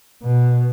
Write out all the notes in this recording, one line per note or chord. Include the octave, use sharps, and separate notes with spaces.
B2